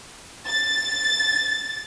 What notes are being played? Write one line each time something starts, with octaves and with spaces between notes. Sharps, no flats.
A6